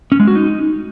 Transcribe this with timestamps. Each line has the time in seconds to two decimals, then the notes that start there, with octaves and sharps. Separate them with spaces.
0.12 C#4
0.20 G#3
0.28 F#4
0.35 D#4